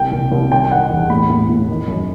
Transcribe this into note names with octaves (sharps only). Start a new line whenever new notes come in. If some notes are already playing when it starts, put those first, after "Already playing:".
Already playing: C2 G5
C2
C2
D#3 G5
D#3 F#5
E2
A2 B5
A2
A2
D#3
F#2